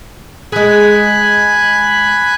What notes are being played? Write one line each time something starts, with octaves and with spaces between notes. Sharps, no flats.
G#3 G#4 G#5 B5 F#6